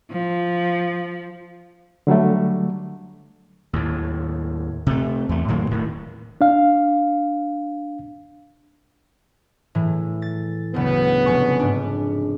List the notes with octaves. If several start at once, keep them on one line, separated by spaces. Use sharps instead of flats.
F3
D3 F#3 G3 A3
D#2 A2
C3 A3
E2 A3
A2 D#3 F#3 A#3
D#1 A2 D#3
D4 F5
A2 E3
A6
F#1 D2 B3
F1 G#5 C#6
G#2 D4